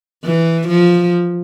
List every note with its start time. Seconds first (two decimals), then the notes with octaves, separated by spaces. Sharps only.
0.24 E3
0.68 F3